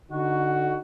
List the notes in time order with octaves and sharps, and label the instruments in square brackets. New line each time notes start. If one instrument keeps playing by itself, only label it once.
[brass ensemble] D3 D#4 F#4